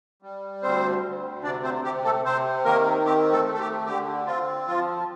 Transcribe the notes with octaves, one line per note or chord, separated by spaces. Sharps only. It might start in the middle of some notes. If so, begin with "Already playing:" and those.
G3
D2 C4 C5
D2
C3 D4 D5
C4 C5
C3 G4
A3 A4
C3 C4 C5
D#3 A#3 A#4
C4 G4
A3 A4
A3
A4
G4
D3 G4
C4 F4
F3 F4